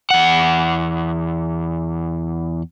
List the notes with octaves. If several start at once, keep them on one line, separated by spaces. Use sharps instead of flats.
E2 F#5